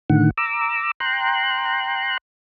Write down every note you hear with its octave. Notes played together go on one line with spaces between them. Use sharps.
A2 D3 D#3 F#5
A#5 D6 E6
G5 A#5 C6 F#6